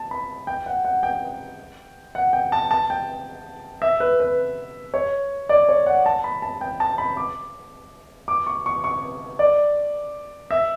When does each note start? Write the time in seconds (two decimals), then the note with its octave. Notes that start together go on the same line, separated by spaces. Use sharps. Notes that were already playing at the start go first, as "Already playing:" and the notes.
Already playing: A5
0.11 B5
0.47 G5
0.66 F#5
0.85 F#5
1.03 G5
2.15 F#5
2.33 G5
2.52 A5
2.71 A5
2.90 G5
3.82 E5
4.00 B4
4.20 B4
4.94 C#5
5.49 D5
5.69 C#5
5.86 F#5
6.06 A5
6.24 B5
6.42 A5
6.61 G5
6.80 A5
6.98 B5
7.17 D6
8.28 D6
8.47 C#6
8.66 C#6
8.84 C#6
9.39 D5
10.51 E5